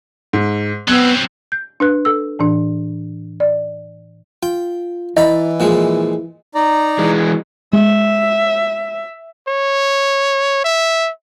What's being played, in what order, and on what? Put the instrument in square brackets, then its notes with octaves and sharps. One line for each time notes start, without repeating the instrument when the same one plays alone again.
[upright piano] G#2
[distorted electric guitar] F#3 C4 [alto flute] B3 [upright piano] E6 F#6 G#6
[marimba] G6
D4 B4 F#6
A4 E6
A2 E3 D4
D5
[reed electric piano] F4 [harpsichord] G5
[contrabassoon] E3 [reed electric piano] E4 [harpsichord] D5 A#5 B5 [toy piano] D#5
[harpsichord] A#2 F3 G#3
[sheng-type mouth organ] D#4 D5 A#5
[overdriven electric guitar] E3 G#3
[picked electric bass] G#3 [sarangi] E5
[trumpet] C#5
E5